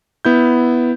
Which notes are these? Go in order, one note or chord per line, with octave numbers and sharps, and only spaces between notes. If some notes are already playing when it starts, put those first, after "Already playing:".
B3 E4 G6